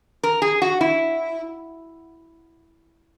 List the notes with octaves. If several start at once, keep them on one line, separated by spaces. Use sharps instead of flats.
A#4
G#4
F#4
E4